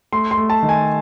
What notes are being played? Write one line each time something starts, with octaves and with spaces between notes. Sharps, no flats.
A3 C6
C6
A3
A5
D#3
G#5